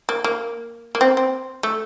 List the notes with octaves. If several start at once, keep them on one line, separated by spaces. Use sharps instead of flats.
A#3
A#3
A#3
C4
C4
A3